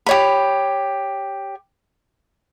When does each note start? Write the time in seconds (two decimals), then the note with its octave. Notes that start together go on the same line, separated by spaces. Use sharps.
0.06 G4 C#5 B5